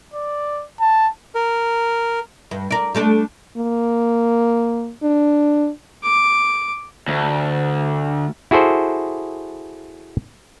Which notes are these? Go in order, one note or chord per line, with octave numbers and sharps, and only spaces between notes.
D5
A5
A#4
G2
A#4 D5
G3 A3 D4
A#3
D4
D6
D2
E4 F#4 G#4 A4 C5